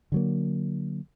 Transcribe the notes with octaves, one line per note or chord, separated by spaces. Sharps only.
D3 F#3 A#3